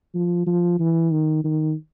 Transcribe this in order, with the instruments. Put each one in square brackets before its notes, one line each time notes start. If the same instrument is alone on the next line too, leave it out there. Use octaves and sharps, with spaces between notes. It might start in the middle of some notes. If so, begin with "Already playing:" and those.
[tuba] F3
F3
E3
D#3
D#3